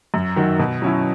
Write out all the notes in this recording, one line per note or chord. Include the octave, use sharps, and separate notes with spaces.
F#2
D#3 F#3
B2
F#3 C#4 E4